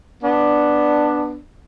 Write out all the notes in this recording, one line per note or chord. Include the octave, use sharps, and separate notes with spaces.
B3 D4